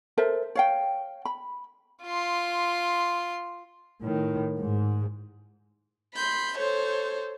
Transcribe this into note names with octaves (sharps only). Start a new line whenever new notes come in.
A4 A#4 C5 E5
C#5 F5 G5
B5
F4 C6
A2 D#3
G#2
B5 C6 G6
A4 C5 C#5